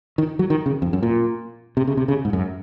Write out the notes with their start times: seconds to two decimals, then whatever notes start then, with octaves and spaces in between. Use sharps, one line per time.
0.18 D#3
0.39 F#3
0.50 D#3
0.66 C#3
0.82 F2
0.93 F#2
1.03 A#2
1.77 C3
1.87 C#3
1.97 C3
2.08 C#3
2.25 G#2
2.33 F#2